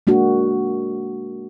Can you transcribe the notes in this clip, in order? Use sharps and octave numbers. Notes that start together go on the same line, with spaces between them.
G#3 A#3 D4 F#4